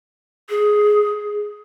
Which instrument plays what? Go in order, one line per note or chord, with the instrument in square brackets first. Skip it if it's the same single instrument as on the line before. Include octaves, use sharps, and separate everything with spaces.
[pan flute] G#4